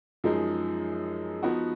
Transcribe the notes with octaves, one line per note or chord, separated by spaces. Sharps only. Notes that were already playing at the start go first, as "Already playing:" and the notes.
F#2 F3 G#3 D#4 G#4
F3 B3 D#4 F#4